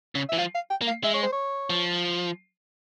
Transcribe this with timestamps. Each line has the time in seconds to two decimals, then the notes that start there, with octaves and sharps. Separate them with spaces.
0.15 C#3
0.29 E3 E5
0.38 F3 F5
0.55 F5
0.70 G5
0.82 A#3
0.87 F5
1.04 G#3 E5
1.14 C#5
1.23 C5
1.32 C#5
1.70 F3